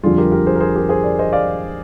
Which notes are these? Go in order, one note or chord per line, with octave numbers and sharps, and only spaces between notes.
F2 D3 G3 F4 G#4
G4 A#4
G4 A#4
G#4 C5
A#4
G#4 C5
G4 A#4
G#4 C5
A#4 D5
C5 D#5
D5 F5